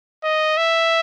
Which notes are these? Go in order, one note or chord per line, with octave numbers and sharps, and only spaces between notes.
D#5
E5